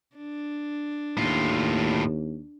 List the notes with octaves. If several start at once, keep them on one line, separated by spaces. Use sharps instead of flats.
D4
D#2 A2 F4